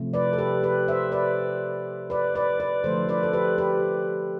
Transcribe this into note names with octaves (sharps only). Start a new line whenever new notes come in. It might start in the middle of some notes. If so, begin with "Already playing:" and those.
Already playing: C3 F3 A3
B4 D5
A4
G4 B4
G4 B4
C5 E5
B4 D5
B4 D5
B4 D5
B4 D5
D3 F3 A3 A4 C5
B4 D5
A4
G4 B4
G4 B4